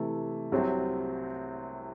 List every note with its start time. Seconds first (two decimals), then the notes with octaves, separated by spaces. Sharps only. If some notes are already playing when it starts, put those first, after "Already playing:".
Already playing: C3 E3 A3
0.52 C2 C3 F#3 C4